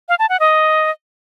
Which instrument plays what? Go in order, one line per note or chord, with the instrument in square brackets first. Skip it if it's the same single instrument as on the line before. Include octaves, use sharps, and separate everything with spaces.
[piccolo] F5
A5
F#5
D#5